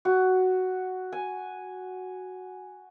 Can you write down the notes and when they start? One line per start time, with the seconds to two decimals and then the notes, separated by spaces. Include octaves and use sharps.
0.05 F#4
1.12 G#5